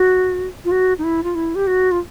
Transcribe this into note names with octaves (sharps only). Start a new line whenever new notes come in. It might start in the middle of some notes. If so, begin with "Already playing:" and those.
Already playing: F#4
F4
F#4
D#4
E4
F4
E4
G4
F#4
F4